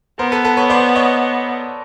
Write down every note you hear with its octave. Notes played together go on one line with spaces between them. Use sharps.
B3 A#4 C5
A4 B4
A4 B4
B4 C#5
C5 D5
C#5 D#5